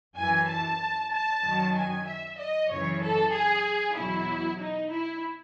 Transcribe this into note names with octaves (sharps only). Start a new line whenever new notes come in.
F#2 E3 G#5
A5
A5
F#2 D#3 F#3
G#5
E5
D#5
F#2 C#3 E3 C#5
A4
G#4
E2 B2 F#3 E4
D#4
E4